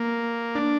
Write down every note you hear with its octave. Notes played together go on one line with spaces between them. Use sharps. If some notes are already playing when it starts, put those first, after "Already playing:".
Already playing: A#3
D4